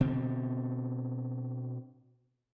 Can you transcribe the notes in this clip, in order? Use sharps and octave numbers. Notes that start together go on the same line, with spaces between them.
B2 D3 C4